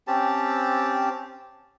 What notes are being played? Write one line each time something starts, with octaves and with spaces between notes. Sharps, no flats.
C4 C#4 G4 A5